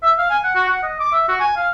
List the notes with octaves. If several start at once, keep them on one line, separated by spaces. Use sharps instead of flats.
E5
F5
G#5
F#5
F#4
F#5
D#5
D6
E5
F#4
G#5
F5